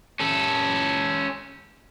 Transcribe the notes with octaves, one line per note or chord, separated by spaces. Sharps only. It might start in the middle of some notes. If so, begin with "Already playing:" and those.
C#4 A4